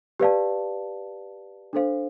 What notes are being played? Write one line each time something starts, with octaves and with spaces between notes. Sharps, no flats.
G4 B4 D5 F5 A5
D4 A4 C5 F5